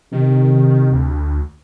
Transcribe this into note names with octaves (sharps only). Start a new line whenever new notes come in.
C3 D#3
D2